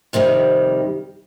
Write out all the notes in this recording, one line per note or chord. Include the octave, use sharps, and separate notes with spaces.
F2 C3 D#3 G3